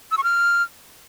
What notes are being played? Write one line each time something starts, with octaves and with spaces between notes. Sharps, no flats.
E6
C#6
F6